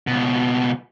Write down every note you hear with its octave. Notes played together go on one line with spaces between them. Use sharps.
C#2 B2